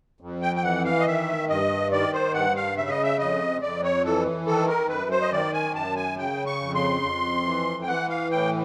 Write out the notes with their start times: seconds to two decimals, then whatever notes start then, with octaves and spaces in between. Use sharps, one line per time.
0.21 F2
0.42 G5
0.56 G5
0.63 E3 F#5
0.85 F5
1.00 D#5
1.06 D#3 E5
1.49 G2 D#5
1.91 D#3 D5
2.13 C5
2.34 G2 F#5
2.56 F5
2.76 C#3 E5
2.89 D#5
3.03 E5
3.19 F2 D#5
3.62 F2 D5
3.83 C#5
4.04 E3 A4
4.46 D#3 A4
4.68 A#4
4.89 F#2 B4
5.11 C5
5.21 D#5
5.32 D#3 D5
5.53 G#5
5.74 F#2 A5
5.96 G#5
6.18 C#3 G5
6.46 C#6
6.60 F2
6.75 C6
7.02 F2
7.45 E3
7.82 G5
7.88 E3 F#5
8.09 F5
8.31 A2 G5